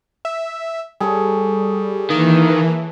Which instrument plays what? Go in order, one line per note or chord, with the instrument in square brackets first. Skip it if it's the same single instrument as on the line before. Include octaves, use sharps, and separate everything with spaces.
[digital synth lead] E5
[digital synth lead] G3 [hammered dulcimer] G#4 A4 C#5
[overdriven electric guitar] D#3 [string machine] E3 [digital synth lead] A#3